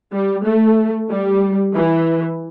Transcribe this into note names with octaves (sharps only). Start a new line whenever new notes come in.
G3
A3
G3
E3